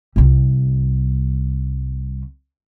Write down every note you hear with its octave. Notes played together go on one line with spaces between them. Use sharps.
C2 G3